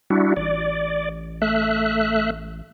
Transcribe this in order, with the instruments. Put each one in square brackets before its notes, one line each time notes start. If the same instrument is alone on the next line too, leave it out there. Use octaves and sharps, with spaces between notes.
[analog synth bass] G3 [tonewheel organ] D4 E4 F#4
[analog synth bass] A1 [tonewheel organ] D5
[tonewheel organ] A3 E5 F#6